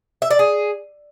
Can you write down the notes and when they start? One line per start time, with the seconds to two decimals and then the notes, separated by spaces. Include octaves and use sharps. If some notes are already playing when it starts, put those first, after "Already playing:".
0.22 E5
0.30 D5
0.39 G#4